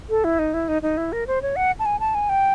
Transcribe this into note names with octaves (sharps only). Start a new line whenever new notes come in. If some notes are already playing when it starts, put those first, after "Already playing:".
A4
E4
D#4
E4
D#4
D#4
E4
A#4
C5
C#5
F#5
A5
G#5
A5
G#5
G5